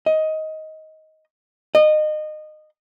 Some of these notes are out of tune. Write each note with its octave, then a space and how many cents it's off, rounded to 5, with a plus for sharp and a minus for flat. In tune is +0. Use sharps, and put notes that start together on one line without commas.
D#5 +15
D#5 -25